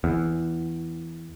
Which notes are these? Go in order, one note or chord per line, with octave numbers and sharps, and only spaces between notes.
E2